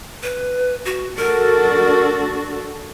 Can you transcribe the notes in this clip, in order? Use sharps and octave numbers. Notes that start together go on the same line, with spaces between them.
B4
F#4
D4 F#4 A4 A#4